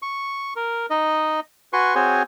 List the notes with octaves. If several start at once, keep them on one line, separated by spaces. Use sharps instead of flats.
C#6
A#4
D#4 D#5
F#4 B4 G#5 C6 C#6
C4 F#4 G#4 C5 C#5 G#5